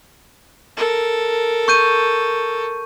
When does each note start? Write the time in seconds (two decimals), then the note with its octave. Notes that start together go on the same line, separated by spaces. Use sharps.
0.76 A4 A#4
1.68 C#6 G6 D#7